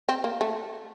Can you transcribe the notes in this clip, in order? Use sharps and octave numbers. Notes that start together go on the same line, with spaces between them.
C4
A#3
A3